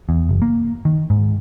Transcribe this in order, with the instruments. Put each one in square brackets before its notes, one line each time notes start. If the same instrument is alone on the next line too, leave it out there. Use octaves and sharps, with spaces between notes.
[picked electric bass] E2
F#1
A#3
D#3
G#2